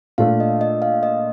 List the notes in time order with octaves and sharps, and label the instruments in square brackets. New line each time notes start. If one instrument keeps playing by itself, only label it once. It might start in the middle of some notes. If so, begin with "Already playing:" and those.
[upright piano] A#2 A3 D4 F4 A4 [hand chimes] F5
[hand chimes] D#5
D#5
F5
D#5